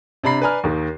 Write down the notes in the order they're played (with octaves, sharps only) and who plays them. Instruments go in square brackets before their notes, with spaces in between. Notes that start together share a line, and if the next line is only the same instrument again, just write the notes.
[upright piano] C3 D4 A#5 B5 C7
B4 D5 G#5 A#5 F6
D#2 D#3